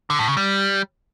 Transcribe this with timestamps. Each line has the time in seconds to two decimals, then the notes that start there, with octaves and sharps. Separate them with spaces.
0.10 D3
0.19 A2
0.28 C#3
0.37 G3